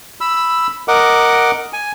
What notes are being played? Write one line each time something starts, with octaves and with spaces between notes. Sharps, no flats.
B5 E6
A#4 D#5 F#5 D6
G#5